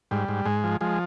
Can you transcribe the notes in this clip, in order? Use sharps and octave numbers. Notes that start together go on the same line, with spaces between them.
G#2 G3
G#2
G#2 G#3
F3
F3 G#3